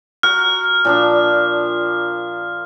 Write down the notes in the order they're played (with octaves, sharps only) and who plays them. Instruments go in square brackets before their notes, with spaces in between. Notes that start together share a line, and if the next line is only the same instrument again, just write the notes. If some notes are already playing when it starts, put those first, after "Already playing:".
[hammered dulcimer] F#4 A#5 [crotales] F6
[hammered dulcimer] A#2 F3 D4